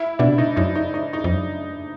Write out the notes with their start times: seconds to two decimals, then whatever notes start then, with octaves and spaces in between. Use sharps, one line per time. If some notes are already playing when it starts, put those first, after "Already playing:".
Already playing: E4
0.19 B2 D4
0.27 C3
0.36 B2 D#4
0.56 F#2 D#4
0.76 D#4
0.94 D#4
1.13 D#4
1.24 F2
1.31 F#2